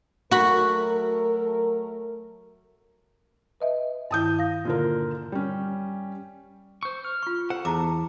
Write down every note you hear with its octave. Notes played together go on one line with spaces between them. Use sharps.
F#3 A3 F#4 A#4 B5
B4 D#5 E5
G2 D#3 E4 A5 D#6 G6
F5 A#6
A#2 D3 A#4
G3 C#4
C5 C#6
F6
F4 C#6
A4 C5 F#5
E2 A5 A#5 D6